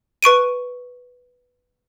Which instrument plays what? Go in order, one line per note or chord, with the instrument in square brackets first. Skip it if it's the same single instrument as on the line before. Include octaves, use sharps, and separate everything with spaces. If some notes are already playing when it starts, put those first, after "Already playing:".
[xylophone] B4 C#6 D7 D#7